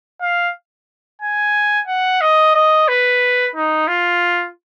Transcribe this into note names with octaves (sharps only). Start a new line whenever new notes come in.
F5
G#5
F#5
D#5
D#5
B4
D#4
F4